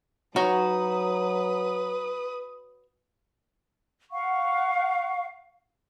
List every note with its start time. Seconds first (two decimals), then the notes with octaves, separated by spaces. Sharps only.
0.36 F#3 D#4 F#4 B4 C#5 D#6
4.12 F5 F#5 C#6